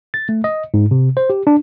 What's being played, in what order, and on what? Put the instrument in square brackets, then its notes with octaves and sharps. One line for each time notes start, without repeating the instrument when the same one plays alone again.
[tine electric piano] A6
A3
D#5
G#2
C3
C5
G4
D4